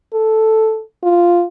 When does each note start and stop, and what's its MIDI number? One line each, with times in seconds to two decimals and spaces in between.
0.13 0.82 69
1.03 1.44 65